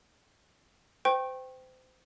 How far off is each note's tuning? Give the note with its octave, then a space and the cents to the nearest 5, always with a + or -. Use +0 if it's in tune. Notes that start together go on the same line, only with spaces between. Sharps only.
C5 -30 G5 +0 C#6 -35